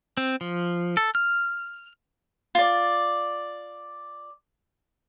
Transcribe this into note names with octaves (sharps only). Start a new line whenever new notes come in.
C4
F3
A4
F6
F4 D5